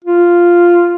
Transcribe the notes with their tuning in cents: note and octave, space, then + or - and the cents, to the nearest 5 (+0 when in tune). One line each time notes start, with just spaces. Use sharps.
F4 -5